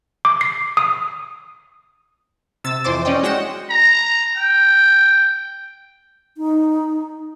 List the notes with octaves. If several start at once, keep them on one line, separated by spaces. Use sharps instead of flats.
D6
C7
D#6
C3 E6 A6 E7
F2 E3 C5 C6 D6 A6
C#4 D5 D#5 G5
G#3 F#4 G5 A#6 C#7 E7
A#5
G5
D#4